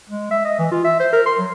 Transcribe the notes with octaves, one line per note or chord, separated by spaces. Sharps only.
G#3
E5
D#5
E3
F4
E5
C5
A#4
C6
F#3